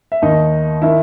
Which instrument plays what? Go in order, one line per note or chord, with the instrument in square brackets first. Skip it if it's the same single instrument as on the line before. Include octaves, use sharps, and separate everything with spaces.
[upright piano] E5
D#2 D#3 D#4 D#5
D#3 E4 E5